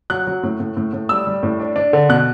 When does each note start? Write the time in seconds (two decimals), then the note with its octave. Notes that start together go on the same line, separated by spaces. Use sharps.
0.10 F#3 F#6
0.27 F#3
0.43 A2
0.60 A2
0.77 A2
0.93 A2
1.09 G3 E6
1.27 G3
1.43 A2
1.60 D4
1.76 D4
1.93 D3
2.09 B2 F#6